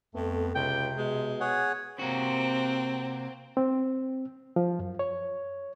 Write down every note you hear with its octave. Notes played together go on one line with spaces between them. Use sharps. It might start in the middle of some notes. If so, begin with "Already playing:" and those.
F2 A3 B3
C#2 C3 G5
B2 G#3
G#4 C#5 F#5
C3 A#3 C4 F#4
C4
F3
F#2
C#5